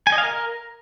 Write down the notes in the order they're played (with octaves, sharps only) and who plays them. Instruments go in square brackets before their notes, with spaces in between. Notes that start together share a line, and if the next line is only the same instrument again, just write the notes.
[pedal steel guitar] G#5
D#5
F5
A#4